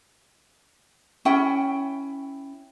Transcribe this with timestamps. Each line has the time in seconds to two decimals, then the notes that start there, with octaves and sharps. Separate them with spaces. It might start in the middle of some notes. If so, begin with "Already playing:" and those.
1.25 C#4 E4 G5